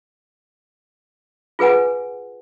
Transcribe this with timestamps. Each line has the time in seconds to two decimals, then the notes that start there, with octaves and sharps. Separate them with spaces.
1.59 F4 G#4 B4 F#5 G#5